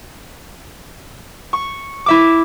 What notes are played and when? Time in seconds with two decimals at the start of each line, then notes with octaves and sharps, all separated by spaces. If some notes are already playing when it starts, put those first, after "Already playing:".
1.53 C#6
2.06 E4 E5 D6